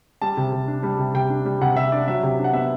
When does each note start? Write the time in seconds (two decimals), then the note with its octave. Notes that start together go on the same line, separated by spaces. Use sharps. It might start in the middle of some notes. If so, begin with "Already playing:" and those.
0.22 G3 A5
0.37 C3
0.53 C3
0.68 D4
0.83 G3
0.99 C3
1.14 C3 G5
1.30 D4
1.45 G3
1.61 C3 F#5
1.76 C3 E5
1.92 D4 D5
2.08 F#3 E5
2.23 C3
2.39 D4
2.44 F#5
2.54 B3 E5